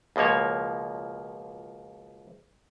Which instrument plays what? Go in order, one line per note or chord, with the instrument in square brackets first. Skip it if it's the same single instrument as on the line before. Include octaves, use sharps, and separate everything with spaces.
[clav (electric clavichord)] C#2 B2 F3 A#3 C#5